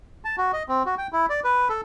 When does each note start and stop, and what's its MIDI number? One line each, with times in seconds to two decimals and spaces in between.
0.25 0.36 81
0.38 0.52 66
0.53 0.63 75
0.69 0.83 60
0.86 0.95 66
0.98 1.07 79
1.13 1.26 64
1.30 1.40 74
1.44 1.68 71
1.69 1.81 69